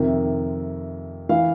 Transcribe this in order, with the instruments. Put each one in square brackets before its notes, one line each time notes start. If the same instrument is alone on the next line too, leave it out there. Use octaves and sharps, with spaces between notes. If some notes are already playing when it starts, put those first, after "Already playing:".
Already playing: [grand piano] F2 C3 D#3 E5
E3 F5